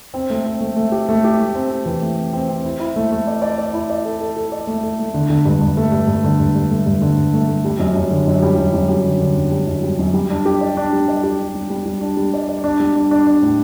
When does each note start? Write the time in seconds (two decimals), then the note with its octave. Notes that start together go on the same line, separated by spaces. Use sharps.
0.14 C4
0.30 A3
0.46 C4
0.61 A3
0.76 A3
0.92 G4
1.09 A3
1.24 G4
1.39 A3
1.55 C4
1.71 C4
1.86 E3
2.01 A3
2.17 C4
2.33 C4
2.49 C4
2.65 E4
2.80 E4
2.96 A3
3.11 A3
3.27 D5
3.42 D5
3.58 D5
3.73 E4
3.90 D5
4.05 A4
4.21 A4
4.36 A4
4.52 D5
4.67 A3
4.83 A4
4.99 A3
5.14 D3
5.30 D3
5.45 G2
5.61 G2
5.77 A3
5.92 G2
6.08 G2
6.24 D3
6.40 G2
6.55 G2
6.71 A3
6.86 G2
7.02 D3
7.17 G2
7.33 A3
7.48 A3
7.65 G3
7.80 F#2
7.96 F#2
8.11 D3
8.27 F#2
8.42 G3
8.58 F#2
8.74 F#2
8.89 G3
9.04 D3
9.20 D3
9.37 F#2
9.52 G3
9.67 F#2
9.83 G3
9.99 F#2
10.14 G3
10.30 D4
10.45 G4
10.61 D5
10.77 D4
10.93 G3
11.08 D5
11.23 G4
11.39 D4
11.55 G3
11.70 G3
11.86 G3
12.01 D4
12.17 G3
12.34 D5
12.49 D5
12.64 D4
12.80 G3
12.96 D4
13.11 D4
13.27 D4
13.42 A2